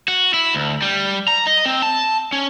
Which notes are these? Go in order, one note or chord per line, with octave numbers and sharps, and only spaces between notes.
F#4
E4
D2
G3
A#5
D#5
C4
A5
C#4